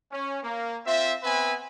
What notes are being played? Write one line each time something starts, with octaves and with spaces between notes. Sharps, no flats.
C#4
A#3
C4 F4 E5
B3 C4 B4 E5 G#5